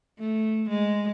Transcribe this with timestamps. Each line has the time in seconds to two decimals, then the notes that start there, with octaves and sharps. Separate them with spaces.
0.19 A3
0.69 G#3